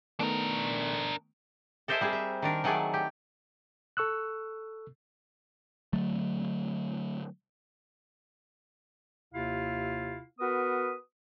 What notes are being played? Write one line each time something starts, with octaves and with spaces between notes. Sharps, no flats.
D#3 A3 B3 D4 A#4
A4 A#4 C5 D#5 E5 G#5
G3 C4 G#4
E5
D#3 D4 A#4
D#3 F#3 A3 G#4 D5
G4
A4 C#6 E6 F#6
D3 F#3 A3
D#2 C3 E4 F4 F5
B3 F#4 A#4 B4 D#6